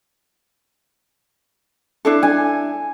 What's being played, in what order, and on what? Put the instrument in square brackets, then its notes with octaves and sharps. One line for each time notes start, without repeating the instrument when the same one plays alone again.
[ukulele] D4 E4 A4
[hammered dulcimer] G#5